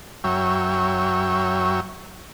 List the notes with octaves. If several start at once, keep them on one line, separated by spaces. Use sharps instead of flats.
F#2 F#3 C#5 E5 G5